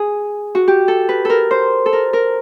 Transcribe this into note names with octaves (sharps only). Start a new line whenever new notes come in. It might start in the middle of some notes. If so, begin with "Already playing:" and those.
Already playing: G#4
F#4
G4
A4
B4
A4 A#4
C5
A4
A#4
A#4